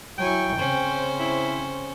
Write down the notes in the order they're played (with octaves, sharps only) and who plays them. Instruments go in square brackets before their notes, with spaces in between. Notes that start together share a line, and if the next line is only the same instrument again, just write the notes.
[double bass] F#3 E4 [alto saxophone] G5 [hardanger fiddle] G#5 C#6
[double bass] C#3 C4 [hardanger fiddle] C#4 C5
[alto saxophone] E4